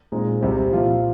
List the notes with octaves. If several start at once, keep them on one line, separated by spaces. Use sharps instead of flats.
A#2 G#3 C4 D#4
C2 C3 G3 C4
A#2 F3 C4 F4